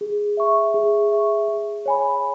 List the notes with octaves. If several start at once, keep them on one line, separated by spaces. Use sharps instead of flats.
G#4
E5 C#6
G#4
E5 C#6
G#4
C#5 G#5 B5